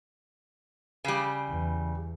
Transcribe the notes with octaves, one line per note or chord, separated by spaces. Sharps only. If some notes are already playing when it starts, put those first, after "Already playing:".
C#3 G3
E2